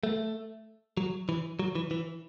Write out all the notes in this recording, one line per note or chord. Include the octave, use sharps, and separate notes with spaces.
A3
F#3
E3
F#3
E3
E3